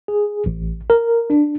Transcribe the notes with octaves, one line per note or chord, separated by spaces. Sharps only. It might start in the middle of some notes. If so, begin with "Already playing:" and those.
G#4
A1
A#4
D4